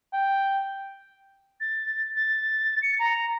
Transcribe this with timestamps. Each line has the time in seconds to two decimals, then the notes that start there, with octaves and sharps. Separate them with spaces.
0.13 G5
1.61 A6
2.16 A6
2.82 C#7
2.99 A#5